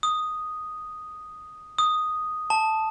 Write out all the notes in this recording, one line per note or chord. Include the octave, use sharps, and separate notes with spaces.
D#6
D#6
A5